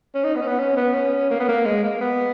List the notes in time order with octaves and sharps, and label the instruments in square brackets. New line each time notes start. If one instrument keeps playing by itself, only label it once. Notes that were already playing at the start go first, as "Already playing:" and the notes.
[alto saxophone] C#4
D#4
B3
C#4
B3
C#4
B3
C#4
A#3
B3
A#3
G#3
A#3
B3